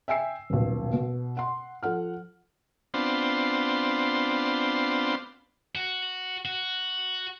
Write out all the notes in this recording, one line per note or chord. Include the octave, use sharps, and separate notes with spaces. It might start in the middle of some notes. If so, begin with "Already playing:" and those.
E5 G5 G#5 E6 C7
D#1 B1
B2
F#5 C6
F3 A4 F#5 F6
B3 C4 D4 F4 C5
F#4
F#4